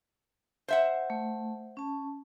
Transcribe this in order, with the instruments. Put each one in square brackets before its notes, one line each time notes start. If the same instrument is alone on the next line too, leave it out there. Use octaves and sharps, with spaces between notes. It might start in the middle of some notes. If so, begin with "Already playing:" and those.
[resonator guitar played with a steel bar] C5 E5 F#5
[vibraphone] A3
C#4 A5